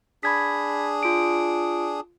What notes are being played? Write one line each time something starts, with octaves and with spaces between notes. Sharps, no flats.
D4 G#4 B5 D#6 G#6 B6
F4 D7